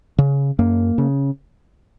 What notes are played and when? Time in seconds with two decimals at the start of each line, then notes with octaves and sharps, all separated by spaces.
0.18 C#3
0.59 F#2 A#3
0.98 C#3